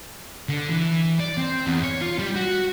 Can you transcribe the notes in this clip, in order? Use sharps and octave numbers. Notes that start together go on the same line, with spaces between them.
D3
E3
D5
C4
E2
C#5
F4
G3
F#4